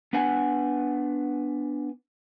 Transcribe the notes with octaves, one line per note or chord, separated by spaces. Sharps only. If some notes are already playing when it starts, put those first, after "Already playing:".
B3 D4 B4 F#5 G#5